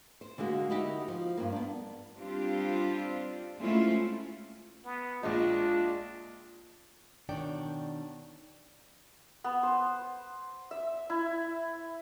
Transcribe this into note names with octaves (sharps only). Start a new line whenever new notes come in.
C5
D3 G#3 A#3 F#4
D#4 E4 F#4 G4
F3
G2 A#3
B3 D4
G3 C4 D4 F4 G4
G#3 A3 C4 C#4 E4 F4
B3
A#1 G#3 D4 F4
B2 D#3 D4 C#5 D5 G5
B3
C5
E5
E4